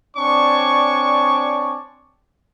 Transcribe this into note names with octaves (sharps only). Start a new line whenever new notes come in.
C4 D4 C#5 D5 G#5 C#6